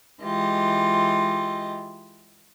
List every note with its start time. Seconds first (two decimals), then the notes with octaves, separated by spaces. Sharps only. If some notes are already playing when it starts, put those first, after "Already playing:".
0.23 E3 G#3 F4 G4 D#5